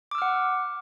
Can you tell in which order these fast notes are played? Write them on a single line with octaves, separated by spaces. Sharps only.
D6 E6 F6 F#5